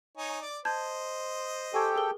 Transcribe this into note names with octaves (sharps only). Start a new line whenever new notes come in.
D#4 C#5 G#5
D5 D6
C5 D#5 A5 G6 G#6
G4 A4 G5 G#5 C#6 G#6
G#4 A#4 G7